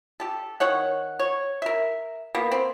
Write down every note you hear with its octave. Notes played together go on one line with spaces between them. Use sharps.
G4 A4
D#3 D#4 C#5 F#5
C#5
A#4 E5
A#3 B3
C4